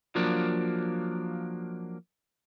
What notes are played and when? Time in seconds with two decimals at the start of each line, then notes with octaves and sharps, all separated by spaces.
0.15 F3 F#3 A#3 D4